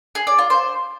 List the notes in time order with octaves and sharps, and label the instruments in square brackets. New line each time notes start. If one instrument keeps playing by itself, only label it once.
[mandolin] G#4
D5
F4
C5